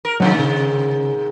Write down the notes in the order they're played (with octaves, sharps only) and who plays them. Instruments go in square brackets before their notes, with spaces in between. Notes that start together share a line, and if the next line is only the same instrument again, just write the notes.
[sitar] A#4
[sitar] G#2 C3 D#3 [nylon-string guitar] F#3 F#5
[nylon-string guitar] C#3